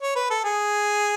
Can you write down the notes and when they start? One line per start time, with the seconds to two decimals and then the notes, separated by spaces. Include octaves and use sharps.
0.02 C#5
0.16 B4
0.30 A4
0.44 G#4